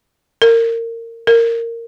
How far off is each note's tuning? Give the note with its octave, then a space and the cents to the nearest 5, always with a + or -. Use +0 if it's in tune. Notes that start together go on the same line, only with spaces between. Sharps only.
A#4 -25
A#4 -15